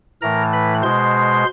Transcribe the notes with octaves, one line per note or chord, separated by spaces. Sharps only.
A2 E3 A3 A#4 A#5
B4 B5
B2 G#3 C5 C6